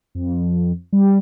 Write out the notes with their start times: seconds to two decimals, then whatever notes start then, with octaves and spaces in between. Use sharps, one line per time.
0.15 F2
0.92 G3